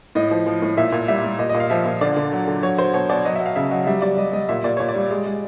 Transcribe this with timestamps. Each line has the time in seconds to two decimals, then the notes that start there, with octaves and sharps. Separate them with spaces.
0.15 A2 D#5
0.31 F3
0.46 F3
0.62 A2
0.77 A#2 E5
0.92 A#2
1.08 G3 E5
1.24 G3
1.39 A#2 D#5
1.49 D#5
1.54 A#2
1.60 F5
1.70 F3 E5
1.86 A#2
2.01 D3 D5
2.16 D3
2.32 F#3
2.47 D3
2.62 F#3 C#5
2.78 F#3 C5
2.94 B2 C#5
3.09 B2 D5
3.25 F#3 D#5
3.35 E5
3.40 F#3
3.46 F5
3.56 C#3 E5
3.71 F#3 D#5
3.87 G3 E5
4.02 G3 D5
4.17 G3 D#5
4.33 G3 D#5
4.49 A#2 E5
4.64 A#2 D5
4.77 A#2 C#5
4.89 D5
4.95 G3
5.10 G#3
5.27 G#3